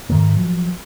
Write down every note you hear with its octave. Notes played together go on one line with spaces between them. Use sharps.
G#2 D#3 A3
F3 F#3